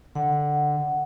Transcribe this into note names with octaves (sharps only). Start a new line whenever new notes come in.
D3 F#5